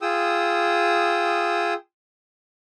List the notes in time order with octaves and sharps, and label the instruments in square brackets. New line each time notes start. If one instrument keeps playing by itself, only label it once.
[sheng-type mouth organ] F4 G#4 G5 D#6 E6